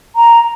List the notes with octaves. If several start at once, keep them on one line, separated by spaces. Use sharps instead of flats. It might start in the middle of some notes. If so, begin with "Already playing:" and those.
A#5